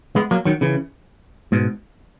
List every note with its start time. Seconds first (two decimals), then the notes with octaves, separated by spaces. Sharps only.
0.16 G#3 B3
0.31 F#3 A#3
0.45 D#3 F#3
0.61 C#3 E3
1.52 G#2 B2